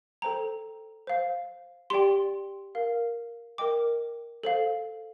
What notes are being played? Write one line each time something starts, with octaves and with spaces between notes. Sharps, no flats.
A4 C5 G5 A#5
C5 F5
G4 D5 G5 C6
A#4 F5
A#4 D#5 G5 D6
A4 C5 F5